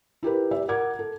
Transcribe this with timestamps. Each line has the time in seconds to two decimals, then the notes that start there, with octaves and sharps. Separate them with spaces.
0.23 E4 G4 A#4 B4
0.51 G4 D5 E5
0.68 A#4 F#5 D6 G#6
0.99 A4